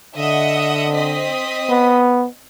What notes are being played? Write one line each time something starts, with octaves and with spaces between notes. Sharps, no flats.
D3 D#5 E5 F#5
C4 D#5 B6
B3